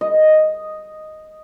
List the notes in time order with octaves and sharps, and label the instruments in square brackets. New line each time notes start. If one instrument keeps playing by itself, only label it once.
[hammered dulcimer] D#5